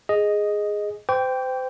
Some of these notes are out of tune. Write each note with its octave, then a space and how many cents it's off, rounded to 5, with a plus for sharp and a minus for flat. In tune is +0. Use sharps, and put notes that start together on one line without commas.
G#4 +0 D#5 +0
C5 -35 G5 +0 D6 -45